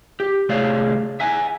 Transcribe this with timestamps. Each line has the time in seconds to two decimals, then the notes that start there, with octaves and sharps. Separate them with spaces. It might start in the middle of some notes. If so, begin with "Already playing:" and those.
0.20 G4
0.49 C2 A3 G#4 C#5 D5 F5
1.20 E5 F#5 G#5